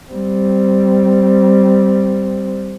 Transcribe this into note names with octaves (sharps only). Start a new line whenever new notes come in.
G3 C4